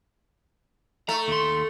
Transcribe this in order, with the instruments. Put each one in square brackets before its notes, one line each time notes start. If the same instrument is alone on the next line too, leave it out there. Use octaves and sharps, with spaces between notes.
[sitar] A3 [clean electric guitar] A#5
[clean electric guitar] D#2 C6